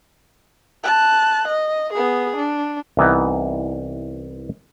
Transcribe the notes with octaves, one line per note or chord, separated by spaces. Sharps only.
A5 F#6
D#5
B3 G#4
D4
C2 E3 B3 D#4